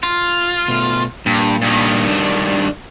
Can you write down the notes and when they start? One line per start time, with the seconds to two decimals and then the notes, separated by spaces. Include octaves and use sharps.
0.03 F4
0.68 B2 A3
1.26 G2 A#2
1.62 G2 D#3
2.08 D4